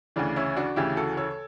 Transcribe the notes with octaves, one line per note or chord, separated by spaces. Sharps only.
D2 C#3 E3 D4
C#4 E4
D4 F#4
D2 C#3 E3 E4 G4
F#4 A4
A4 C#5